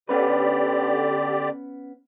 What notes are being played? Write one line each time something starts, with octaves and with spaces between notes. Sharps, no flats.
D3 B3 C#4 G4 B4 D5